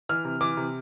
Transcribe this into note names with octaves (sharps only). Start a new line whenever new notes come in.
E3 F6
C3
E3 D6
C3